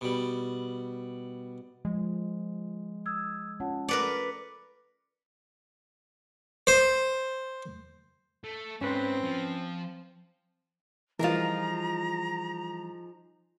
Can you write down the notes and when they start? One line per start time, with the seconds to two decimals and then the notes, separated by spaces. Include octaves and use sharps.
0.01 B2 G3
1.85 F3 G#3
3.06 D#6 E6 G#6
3.60 C#4 F4 C#5 F#5 A5
3.88 A#4 B4 D5 D6 C#7
6.67 C5
8.44 A3
8.81 G#2 C4 C#4 B4 C5
9.24 F3
11.19 E3 F3 G3 D#4 F4 G#4 A#4 A#5